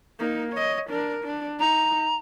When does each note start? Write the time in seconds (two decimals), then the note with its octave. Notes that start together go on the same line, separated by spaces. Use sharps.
0.19 A#3 D#4
0.53 C#5 D#5
0.90 D4 A#4
1.24 D4
1.59 D#4 A#5